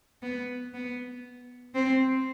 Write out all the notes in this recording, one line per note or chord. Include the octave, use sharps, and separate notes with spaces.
B3
B3
C4